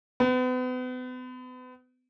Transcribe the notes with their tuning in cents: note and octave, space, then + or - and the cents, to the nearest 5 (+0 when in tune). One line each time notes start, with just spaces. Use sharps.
B3 +40